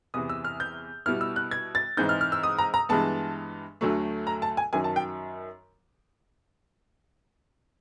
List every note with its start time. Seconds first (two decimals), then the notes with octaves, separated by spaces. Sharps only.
0.14 E2 C3 E3 D#6
0.29 E6
0.44 F6
0.60 G6
1.06 B2 G3 B3 E4 F6
1.21 E6
1.36 F#6
1.51 G#6
1.75 A6
1.97 G#2 E3 G#3 C4 D#4 G6
2.09 F6
2.21 F6
2.32 E6
2.43 D#6
2.58 A#5
2.74 A#5
2.89 G2 E3 G#3 B3 A5
3.81 D2 D3 F#3 A3
4.27 A#5
4.42 A5
4.57 G#5
4.73 F#2 D#3 F#3 G#5
4.84 A5
4.96 G5